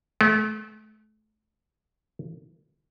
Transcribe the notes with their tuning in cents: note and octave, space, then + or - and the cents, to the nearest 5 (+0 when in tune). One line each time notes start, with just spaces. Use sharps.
A3 -35